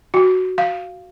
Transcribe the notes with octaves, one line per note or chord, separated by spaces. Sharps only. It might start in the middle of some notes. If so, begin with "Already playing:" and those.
F#4
F5